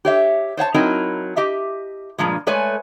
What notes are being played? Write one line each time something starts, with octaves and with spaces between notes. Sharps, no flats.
G4 C#5 E5
C5 C#5 F#5 A5
F#3 C4 D#4 E4 A#4
G4 D#5 E5
G2 A#2 F3 G#3
G#3 A3 B4 C#5 D5 G#5